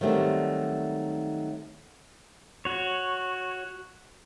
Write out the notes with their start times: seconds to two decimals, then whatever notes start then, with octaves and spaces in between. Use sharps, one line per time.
0.01 D#3 F#3 G3 A3 C4 D4
2.65 F#4 C#5